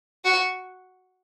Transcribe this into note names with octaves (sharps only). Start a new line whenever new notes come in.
F#4